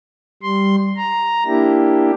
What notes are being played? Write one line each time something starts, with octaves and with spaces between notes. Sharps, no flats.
G3 C6
A#5
A#3 D4 E4 G4